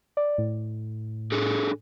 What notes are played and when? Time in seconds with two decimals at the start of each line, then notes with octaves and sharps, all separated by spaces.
0.17 D5
0.38 A2
1.32 D4 G#4 A4